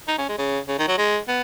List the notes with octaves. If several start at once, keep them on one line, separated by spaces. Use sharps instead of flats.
D#4
C#4
G#3
C#3
C#3
D#3
F#3
G#3
B3